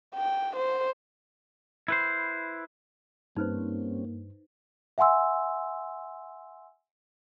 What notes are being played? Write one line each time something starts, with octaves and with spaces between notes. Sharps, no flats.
G5
C5
E4 B4 C5
G2 G3 A#3 C4 C#4 D#4 B4 C5
E5 F#5 G#5 C6 E6